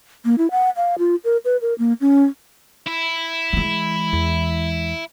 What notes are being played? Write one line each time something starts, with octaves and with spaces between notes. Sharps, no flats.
A#3
E4
F#5
F5
F4
A#4
B4
A#4
A#3
C#4
E4
E3 G#3
E2